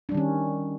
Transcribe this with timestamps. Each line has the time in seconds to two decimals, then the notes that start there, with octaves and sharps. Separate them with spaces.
0.09 D4
0.12 G3
0.15 D#3
0.17 C#4